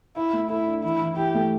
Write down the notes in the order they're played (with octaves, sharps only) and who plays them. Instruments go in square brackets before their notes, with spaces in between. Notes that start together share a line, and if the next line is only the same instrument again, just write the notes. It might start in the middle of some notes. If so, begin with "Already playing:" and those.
[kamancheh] E4 [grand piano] E5
[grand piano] A3
[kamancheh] E4 [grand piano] A4
[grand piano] D4
[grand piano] E3 [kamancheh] E4
[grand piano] E3
[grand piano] E4 [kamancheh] G4
[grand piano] A3